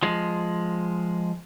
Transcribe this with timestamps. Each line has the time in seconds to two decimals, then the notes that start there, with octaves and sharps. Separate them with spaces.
0.03 F3 G#3